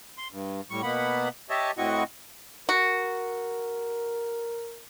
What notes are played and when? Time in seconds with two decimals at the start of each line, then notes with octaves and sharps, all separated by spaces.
0.18 C6
0.32 G2
0.71 A2 G3 C#6
0.83 B2 A#3 B3 F#5 B5
1.50 G4 C#5 D#5 E5 A5
1.78 A2 C4 E4 F#4 D#5 C#6
2.69 F#4 A#4